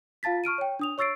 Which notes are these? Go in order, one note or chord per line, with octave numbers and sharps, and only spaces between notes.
F4 F5 A5 A6 B6
C#6 F6 D7 D#7
C#5 G5
D4 D#6 F7
C#5 C#6 E6 A6 C7 D7